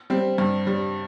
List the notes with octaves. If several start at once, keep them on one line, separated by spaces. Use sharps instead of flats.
G3 C4
G2
G3